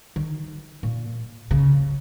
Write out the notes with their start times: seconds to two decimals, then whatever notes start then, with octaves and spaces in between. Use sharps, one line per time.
0.16 D#3
0.83 A#2
1.51 C#3